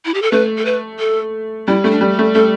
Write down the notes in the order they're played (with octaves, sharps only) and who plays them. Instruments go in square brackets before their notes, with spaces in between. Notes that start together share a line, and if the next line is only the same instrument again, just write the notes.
[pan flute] E4
G4
A4
[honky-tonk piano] A3 [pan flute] B4
[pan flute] A4
B4
A4
[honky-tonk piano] G3 [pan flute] E4
[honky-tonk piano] A3 [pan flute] E4
[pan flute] D4
[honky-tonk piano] G3
[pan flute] G4
[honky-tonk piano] A3
[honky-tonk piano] A3 [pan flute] A4